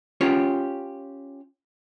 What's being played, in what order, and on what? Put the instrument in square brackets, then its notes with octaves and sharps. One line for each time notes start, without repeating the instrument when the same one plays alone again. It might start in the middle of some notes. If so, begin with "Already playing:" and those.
[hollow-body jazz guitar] C#4 F4 G4 C#5